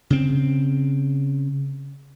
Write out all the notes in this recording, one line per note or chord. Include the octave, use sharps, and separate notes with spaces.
C#3 C4